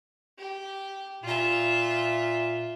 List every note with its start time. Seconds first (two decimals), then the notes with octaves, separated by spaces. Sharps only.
0.38 G4
1.23 A#2 F4 E5